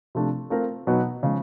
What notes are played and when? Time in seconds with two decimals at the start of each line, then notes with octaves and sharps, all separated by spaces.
0.15 C3 F3 A3 D4
0.50 A3 C4 F4 A#4
0.87 B2 F#3 B3 D#4
1.23 C#3 F3 G#3